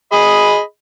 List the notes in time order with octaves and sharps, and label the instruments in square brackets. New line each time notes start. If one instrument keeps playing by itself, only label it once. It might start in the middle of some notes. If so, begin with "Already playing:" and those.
[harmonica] G#4 D#5 B5